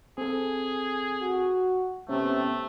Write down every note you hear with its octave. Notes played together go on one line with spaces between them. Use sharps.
C4 G#4 A4
F#4
C3 A3 B3 C#4